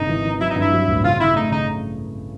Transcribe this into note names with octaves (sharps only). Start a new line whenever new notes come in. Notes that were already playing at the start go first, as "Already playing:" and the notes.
Already playing: G#1 C#3 D#4
E3
E3
F#3 E4
D#4
G2 E4
F#3
A1
C#3 F4
C#3 E4
A3 D#4
C#3 D#4